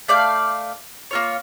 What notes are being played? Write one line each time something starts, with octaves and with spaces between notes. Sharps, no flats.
A3 D5 F5 G6
A#3 F4 C#5